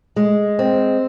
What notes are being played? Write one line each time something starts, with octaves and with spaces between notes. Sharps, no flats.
G#3
C4